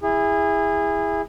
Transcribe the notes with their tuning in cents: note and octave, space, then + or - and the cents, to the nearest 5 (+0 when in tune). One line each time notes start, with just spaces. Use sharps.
E4 +0 G#4 -25